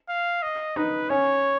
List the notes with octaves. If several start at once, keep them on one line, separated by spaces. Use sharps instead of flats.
F5
D#5
D#4 B4
C#4 C#5